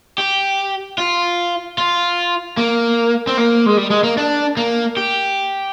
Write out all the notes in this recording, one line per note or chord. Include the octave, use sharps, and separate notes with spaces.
G4
F4
F4
A#3
C4
A#3
G#3
G3
G#3
A#3
D4
A#3
G4